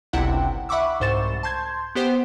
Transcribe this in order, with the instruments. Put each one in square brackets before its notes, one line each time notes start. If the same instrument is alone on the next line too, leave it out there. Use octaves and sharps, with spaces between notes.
[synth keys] G1 C#2 C3 E4 F#5 G5
E5 F#5 B5 C#6 D6 E6
C2 G#2 C5 C#6 A6 E7
A5 C6 G6 G#6
B3 G4 C5 F#5